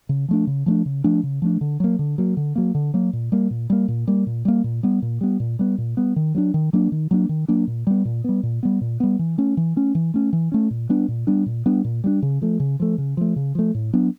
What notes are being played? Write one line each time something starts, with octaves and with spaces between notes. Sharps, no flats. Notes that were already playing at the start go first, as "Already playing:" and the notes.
C#3
F3 A3 D4
C#3
F3 A3 D4
C#3
F3 A3 D4
C#3
F3 A3 D4
D3
F#3 A#3
D3
F#3 A#3
D3
F#3 A#3
D3
F#3 A#3
A#2
G3 A#3
A#2
G3 A#3
A#2
G3 A#3
A#2
G3 A#3
A#2
G3 B3
A#2
G3 B3
A#2
G3 B3
A#2
G3 B3
D#3
F#3 A#3 D4
D#3
F#3 A#3 D4
D#3
F#3 A#3 D4
D#3
F#3 A#3 D4
A#2
G3 B3
A#2
G3 B3
A#2
G3 B3
A#2
G3 B3
E3
A3 C#4
E3
A3 C#4
E3
A3 C#4
E3
A3 C#4
A#2
G3 B3 D4
A#2
G3 B3 D4
A#2
G3 B3 D4
A#2
G3 B3 D4
C#3
F3 A3
C#3
F3 A3
C#3
F3 A3
C#3
F3 A3
A2
F#3 B3 D4